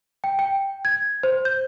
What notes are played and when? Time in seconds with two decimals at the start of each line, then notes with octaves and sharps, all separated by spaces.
0.24 G5
0.39 G5
0.85 G#6
1.23 C5
1.45 G6